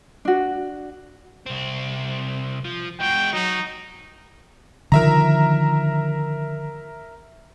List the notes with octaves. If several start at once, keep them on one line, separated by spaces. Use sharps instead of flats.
D4 F#4
C2 C4
F3
G#3 F#4 G5
F#3 D#4 F#4
D3 D#3 F3 A#4 E5 A#5